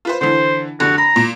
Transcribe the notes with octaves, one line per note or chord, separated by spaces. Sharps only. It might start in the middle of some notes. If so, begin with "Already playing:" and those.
F4 B4 C5
D3 E3 C5
F1 D3 F#4
A#5 B5
A#2